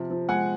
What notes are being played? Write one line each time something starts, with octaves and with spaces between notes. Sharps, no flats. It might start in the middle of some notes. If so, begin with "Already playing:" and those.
Already playing: C3 F3
F3
G#3 F#5 G#5